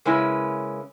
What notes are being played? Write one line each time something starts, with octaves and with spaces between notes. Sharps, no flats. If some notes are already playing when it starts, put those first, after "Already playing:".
C#3 G#3 A#3 C#4 E4 B4